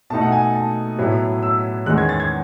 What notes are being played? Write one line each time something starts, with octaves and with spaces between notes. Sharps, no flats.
B2 A3 D#4 A5
F#5
G#5
A5
A2 F#3 B3 E4
E6
E2 D#3 G#3 C#4 F#6
G#6
A6
G#6